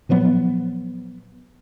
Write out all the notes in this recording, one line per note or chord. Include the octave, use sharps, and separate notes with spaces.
A#2 F3 F#3 B3